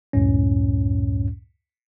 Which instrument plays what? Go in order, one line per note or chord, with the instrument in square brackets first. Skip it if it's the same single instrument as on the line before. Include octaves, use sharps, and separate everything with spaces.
[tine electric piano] C#2 F#2 A2 C#4